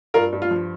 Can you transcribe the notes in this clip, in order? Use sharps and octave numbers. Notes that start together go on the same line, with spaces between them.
G2 F4 A#4
G2
F4
F3